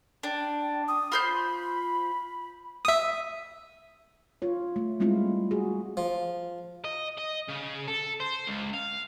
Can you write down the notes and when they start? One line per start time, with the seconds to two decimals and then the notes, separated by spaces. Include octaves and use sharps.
0.23 D4 G5
0.88 D#6
1.12 F4 C5 B5 G6
2.85 E5 D#6
4.42 F4 C#5
4.76 A3
5.00 G3 G#3 C4 E4 F4
5.51 F#4 G#4
5.97 F3
6.84 D#5
7.18 D#5
7.49 C#3
7.88 A4
8.20 C5
8.48 C#2
8.74 F5